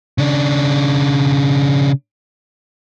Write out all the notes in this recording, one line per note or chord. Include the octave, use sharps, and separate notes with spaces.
C#3 D4